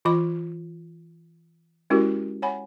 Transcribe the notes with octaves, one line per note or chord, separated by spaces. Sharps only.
E3 F4 D#5 B5 D6
G#3 C#4 E4 F#4 G4 A#4
C#5 F#5 G#5 B5